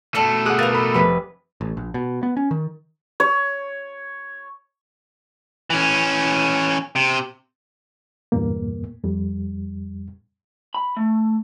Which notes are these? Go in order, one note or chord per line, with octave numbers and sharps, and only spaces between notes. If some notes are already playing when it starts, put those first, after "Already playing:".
B2 A3 A4 D5 F6
G#4 F#5 D6 D#6 F#6
A#4 B4 F5 A#5 A6
A4 B5
F1 B4
A1
A#1
B2
B3
C#4
D#3
C#5
E3 C#4
C3
E2 G2 A#2 A#3
F2 G3
B5
A3